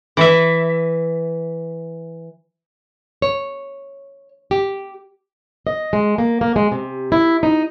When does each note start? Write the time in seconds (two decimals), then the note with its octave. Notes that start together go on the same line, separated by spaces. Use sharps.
0.17 E3 E5
3.22 C#5
4.51 G4
5.67 D#5
5.93 G#3
6.18 A#3
6.41 A#3
6.56 G#3
6.72 C3
7.12 E4
7.43 D#4